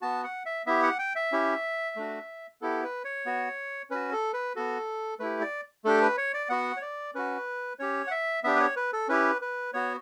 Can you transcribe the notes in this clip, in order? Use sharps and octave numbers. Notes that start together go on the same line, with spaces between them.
B3 F#4 A5
F#5
E5
B3 E4 G4 E5
F#5
G5
E5
C#4 E4 G4
A3 D4 F#4
B3 E4 G4 A4
B4
C#5
B3 F#4
C#4 F#4 B4
A4
B4
B3 F#4 A4
A3 E4 G4 B4
D5
A3 D4 G4 A4
B4
C#5
D5
B3 F#4 F#5
C#5
D5
C#4 F#4 B4
C#4 G4 C#5
F#5
E5
B3 D4 G4 E5
B4
C#5
B4
A4
C#4 E4 G4 B4
B4
B3 F#4 C#5